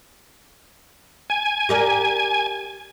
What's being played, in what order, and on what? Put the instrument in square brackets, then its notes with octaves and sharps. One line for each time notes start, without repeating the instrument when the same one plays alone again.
[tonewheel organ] G#5
[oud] G4 A#4 D5